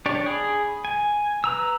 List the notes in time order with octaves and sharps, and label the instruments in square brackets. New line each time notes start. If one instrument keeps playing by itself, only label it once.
[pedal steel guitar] D4 G4 C#5 D5
G#4 B5
G#5
B4 A#5 E6